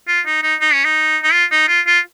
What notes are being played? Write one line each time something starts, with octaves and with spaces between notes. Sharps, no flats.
F4
D#4
D#4
D#4
C#4
D#4
D#4
F4
D#4
F4
F4